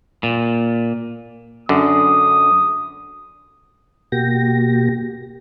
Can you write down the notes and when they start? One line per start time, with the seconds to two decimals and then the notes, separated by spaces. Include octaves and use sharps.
0.23 A#2
1.69 F#2 D3 D#6
4.12 B2 A#3 F#4 G4 G5 A#6